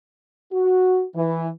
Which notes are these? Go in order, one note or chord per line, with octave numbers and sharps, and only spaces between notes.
F#4
E3